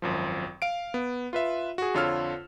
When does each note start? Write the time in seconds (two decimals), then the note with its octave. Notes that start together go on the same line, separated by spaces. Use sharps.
0.02 G#1 F#2 F3
0.62 F5 D7
0.94 B3
1.33 F4 B4 E5
1.78 F#4 G#4
1.94 F2 D3 F4 C#5 E6 F6